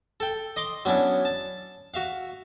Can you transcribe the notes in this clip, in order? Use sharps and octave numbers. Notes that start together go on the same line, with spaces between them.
A4 G5
D#5 C6 D6
F#3 B3 C#4 D4 E4
A5
F#4 E5 F5